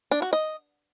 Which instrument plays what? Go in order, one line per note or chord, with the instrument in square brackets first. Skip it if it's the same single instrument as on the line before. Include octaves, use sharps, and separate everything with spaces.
[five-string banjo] D4
F#4
D#5